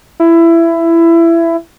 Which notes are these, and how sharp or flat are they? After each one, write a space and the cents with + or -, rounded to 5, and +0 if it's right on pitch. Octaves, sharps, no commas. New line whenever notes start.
E4 +20